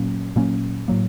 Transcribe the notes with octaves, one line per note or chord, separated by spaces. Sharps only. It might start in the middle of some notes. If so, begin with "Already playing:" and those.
Already playing: A#2 F#3 A#3 C#4
A#2 F#3 A#3 C#4
A2 F#3 A#3